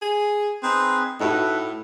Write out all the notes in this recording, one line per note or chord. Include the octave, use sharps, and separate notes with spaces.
G#4
C4 D#4 G#4 B4
A2 D#4 E4 F#4 A4 B4